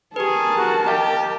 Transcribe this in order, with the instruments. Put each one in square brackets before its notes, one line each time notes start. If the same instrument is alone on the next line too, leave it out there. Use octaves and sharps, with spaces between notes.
[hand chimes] G4 B4 [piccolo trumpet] G#4 [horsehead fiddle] A#4 A5
[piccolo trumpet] F#4
[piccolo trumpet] G4 [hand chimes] D#5 F5